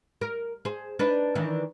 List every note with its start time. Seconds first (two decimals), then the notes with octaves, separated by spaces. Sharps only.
0.21 A#4
0.65 G#4 C5
0.99 D4 D#4 B4
1.35 D#3 E3 D4